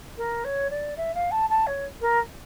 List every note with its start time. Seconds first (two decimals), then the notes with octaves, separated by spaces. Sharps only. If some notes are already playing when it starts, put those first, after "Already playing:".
0.17 A#4
0.44 C#5
0.70 D5
0.97 E5
1.14 F5
1.31 A5
1.50 A5
1.67 C#5
2.01 A#4